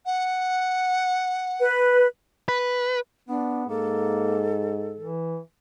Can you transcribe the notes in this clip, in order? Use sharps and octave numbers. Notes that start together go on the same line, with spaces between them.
F#5
B4
B4
B3 D4
G#2 A#3 A4
E3